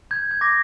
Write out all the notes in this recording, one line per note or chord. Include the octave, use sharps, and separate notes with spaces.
G6 G#6
G#6
D6 A#6